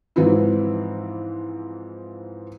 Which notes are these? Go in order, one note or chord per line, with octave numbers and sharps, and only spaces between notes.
G#2 E3 F3 C4 E4